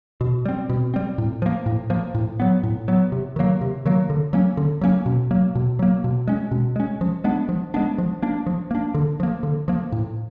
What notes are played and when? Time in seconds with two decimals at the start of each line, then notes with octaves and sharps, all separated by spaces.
0.21 B2
0.45 G3 C4
0.69 B2
0.94 G3 C4
1.18 A2
1.42 F3 A#3
1.66 A2
1.90 F3 A#3
2.15 A2
2.40 F#3 B3
2.63 A2
2.88 F#3 B3
3.12 C3
3.36 D#3 F#3 A#3
3.61 C3
3.85 D#3 F#3 A#3
4.10 D3
4.33 F#3 A#3 C#4
4.57 D3
4.81 F#3 A#3 C#4
5.06 B2
5.31 F#3 A#3
5.55 B2
5.79 F#3 A#3
6.04 B2
6.27 G#3 C#4
6.51 B2
6.76 G#3 C#4
7.01 F3
7.24 G#3 B3 D4
7.49 F3
7.74 G#3 B3 D4
7.98 F3
8.23 A#3 D4
8.46 F3
8.71 A#3 D4
8.94 D3
9.20 F3 A#3
9.43 D3
9.68 F3 A#3
9.92 A2